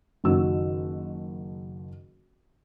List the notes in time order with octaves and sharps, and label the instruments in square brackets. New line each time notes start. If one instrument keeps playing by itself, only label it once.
[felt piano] F#1 D#3 F#4 E6